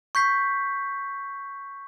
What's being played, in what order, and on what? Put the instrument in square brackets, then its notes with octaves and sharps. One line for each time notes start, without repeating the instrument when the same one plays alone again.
[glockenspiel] C#6 G6 B6 C7